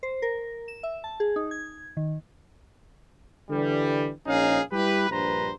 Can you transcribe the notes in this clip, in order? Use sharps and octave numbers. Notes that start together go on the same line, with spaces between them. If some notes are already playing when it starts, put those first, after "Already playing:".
C5
A#4
E7
E5
A5
G#4
D#4
G#6
D#3
D3 E3 G3
A#1 C#4 D#4 G#4 F5
G3 E4 G4 B4
A#1 G2 B4 C5 A#5